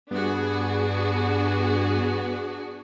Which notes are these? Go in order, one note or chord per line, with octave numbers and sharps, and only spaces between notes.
G2 B3 D4 F#4 G#4